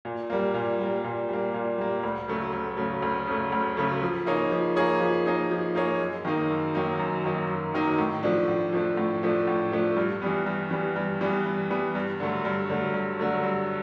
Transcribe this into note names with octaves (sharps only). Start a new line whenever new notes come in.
A#2
G3 A#3
A#2
G3 A#3
A#2
G3 A#3
A#2
G3 A#3
D2
C#3 F#3 A3
D2
C#3 F#3 A3
D2
C#3 F#3 A3
D2
C#3 F#3 A3
F3
A#3 D#4 G#4 C#5
F3
A#3 D#4 G#4 C#5
F3
A#3 D#4 G#4 C#5
F3
A#3 D#4 G#4 C#5
F#2
D#3 F#3 A#3 D#4
F#2
D#3 F#3 A#3 D#4
F#2
D#3 F#3 A#3 D#4
F#2
D#3 F#3 A#3 D#4
A2
F3 A3 D4
A2
F3 A3 D4
A2
F3 A3 D4
A2
F3 A3 D4
G2
E3 G3 B3
G2
E3 G3 B3
G2
E3 G3 B3
G2
E3 G3 B3
G2
D3 F#3 A3
G2
D3 F#3 A3
G2
D3 F#3 A3
G2